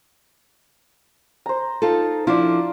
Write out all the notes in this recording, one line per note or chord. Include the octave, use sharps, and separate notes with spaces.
C5 A#5
D#4 F4 A4
F3 D4 E4 F4 D5